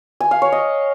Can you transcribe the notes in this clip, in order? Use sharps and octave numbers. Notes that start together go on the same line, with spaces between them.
G#5
F5
C#5
D#5